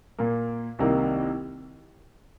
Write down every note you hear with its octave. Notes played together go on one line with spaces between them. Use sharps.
A#2 A#3
C2 C3 D#3 A#3